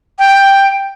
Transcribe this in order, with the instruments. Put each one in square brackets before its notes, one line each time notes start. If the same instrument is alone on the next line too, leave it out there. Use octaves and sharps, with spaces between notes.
[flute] G5